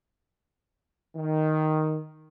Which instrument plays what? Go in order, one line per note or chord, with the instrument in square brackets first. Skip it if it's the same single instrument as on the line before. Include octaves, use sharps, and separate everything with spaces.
[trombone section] D#3